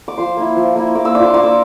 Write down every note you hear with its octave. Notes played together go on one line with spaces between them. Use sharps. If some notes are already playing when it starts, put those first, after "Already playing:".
D6
F3 C6
A#3 E4
F3
A#3 E4
A#3 D6
E6
D4 F4 D6
C6
A#3 D6
E6